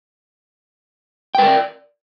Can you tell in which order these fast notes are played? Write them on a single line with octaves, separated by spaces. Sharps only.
G5 B4 A#4 D5